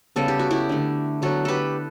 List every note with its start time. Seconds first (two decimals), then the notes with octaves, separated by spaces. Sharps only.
0.16 C#3 G3 B3 A4
0.28 G4
0.39 F#4
0.51 E4 G4
0.69 D3 A3
1.22 D3 F#3 B3 F#4 A4
1.45 G4 A4 B4